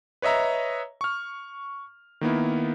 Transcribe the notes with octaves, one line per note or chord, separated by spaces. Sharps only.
B4 C#5 D#5 E5 A#5
C#6 F6
D#3 A#3 B3 E4